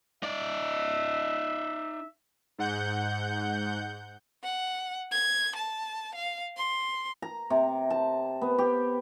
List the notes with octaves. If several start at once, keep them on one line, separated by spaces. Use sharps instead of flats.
D#4 D5 E5
G#2 F#5 G6
F#5
G#6
A5
F5
C6
A#5
C3
A5
B3
G4